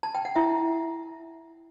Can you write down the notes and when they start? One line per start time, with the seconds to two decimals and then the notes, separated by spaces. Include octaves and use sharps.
0.03 A5
0.15 G5
0.25 F#5
0.36 E4 E5